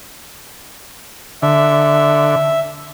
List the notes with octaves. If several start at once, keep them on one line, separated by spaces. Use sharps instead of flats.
D3 E5